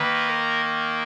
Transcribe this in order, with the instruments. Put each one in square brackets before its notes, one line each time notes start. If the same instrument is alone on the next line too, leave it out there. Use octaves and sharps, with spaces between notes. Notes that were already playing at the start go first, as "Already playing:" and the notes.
Already playing: [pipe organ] D#3 A#3 B4
A#4